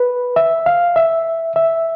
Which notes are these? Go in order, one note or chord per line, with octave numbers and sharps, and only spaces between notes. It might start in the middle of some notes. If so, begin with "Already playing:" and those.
Already playing: B4
E5
F5
E5
E5